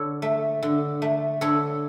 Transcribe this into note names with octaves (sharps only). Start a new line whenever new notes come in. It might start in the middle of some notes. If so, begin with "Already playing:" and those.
Already playing: D3 A4 C#5
A3
D3
A3
D3 A4 C#5